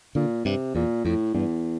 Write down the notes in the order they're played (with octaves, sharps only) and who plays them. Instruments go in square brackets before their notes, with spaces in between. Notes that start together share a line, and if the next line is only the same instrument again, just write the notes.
[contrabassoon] A#2 [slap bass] D3
[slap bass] G2 [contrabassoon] C3
[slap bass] E2 [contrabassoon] A#2
[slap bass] F2 [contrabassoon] A2
[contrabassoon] E2 [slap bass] G2